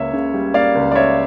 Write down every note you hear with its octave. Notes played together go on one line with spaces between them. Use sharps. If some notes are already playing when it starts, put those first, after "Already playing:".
Already playing: C#2 A#3 C#5 E5
C#3
G3
A#3 D5 F5
C#2
D5
C#3 C#5 E5